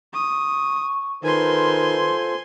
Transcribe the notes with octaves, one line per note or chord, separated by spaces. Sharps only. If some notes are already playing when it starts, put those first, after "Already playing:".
C#6 D#6
D#3 F4 A4 B4 C5 G#5 C6